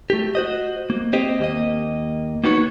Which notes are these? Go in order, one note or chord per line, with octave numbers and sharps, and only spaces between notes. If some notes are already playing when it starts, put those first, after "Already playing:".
A3 G4
F#4 C5 D#5
A#3
C4 G4 C5 D#5
D#2 A#3 D#5
A#3 B3 D#4 F#4 C5 C#5